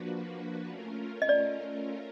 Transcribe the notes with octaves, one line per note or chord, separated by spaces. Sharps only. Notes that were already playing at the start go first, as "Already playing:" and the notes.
Already playing: F3 A#3 D4 F#4 B4
A3 C#4 F4 A#4
D#5
D5